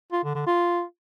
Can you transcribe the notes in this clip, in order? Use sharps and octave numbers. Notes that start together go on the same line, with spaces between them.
F4
D3
D3
F4